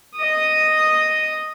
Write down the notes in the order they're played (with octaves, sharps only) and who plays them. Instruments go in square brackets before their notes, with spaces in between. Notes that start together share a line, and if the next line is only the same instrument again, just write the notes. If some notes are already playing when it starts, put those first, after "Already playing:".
[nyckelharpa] D#5 D#6